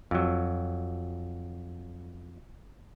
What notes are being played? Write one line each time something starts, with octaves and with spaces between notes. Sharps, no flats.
F2 F#3